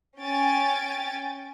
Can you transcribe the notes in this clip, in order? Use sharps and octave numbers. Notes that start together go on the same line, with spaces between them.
C#4 G5 G#5 A6 D7